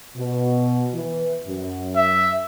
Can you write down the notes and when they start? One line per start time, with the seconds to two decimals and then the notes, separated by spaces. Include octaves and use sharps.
0.16 B2
0.94 E3
1.46 F#2
1.96 E5